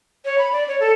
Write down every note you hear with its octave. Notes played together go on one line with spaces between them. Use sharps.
C#5
B5
D5
C#5
A4